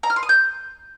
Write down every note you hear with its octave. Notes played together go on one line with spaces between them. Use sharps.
A#5
F6
C6
D#6
G6